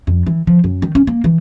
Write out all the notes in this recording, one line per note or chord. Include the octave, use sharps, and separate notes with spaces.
F2
E3
F3
F#2
D#3
C#4
A#3
E3